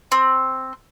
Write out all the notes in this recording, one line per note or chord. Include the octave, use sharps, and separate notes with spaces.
C4